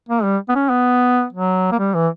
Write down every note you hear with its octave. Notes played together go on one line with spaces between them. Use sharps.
A#3
G3
B3
C#4
B3
F#3
A#3
G3
E3